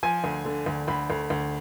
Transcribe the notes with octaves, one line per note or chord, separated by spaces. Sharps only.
F3 G#5
D2
D3
D2
D2 B5
D2
D2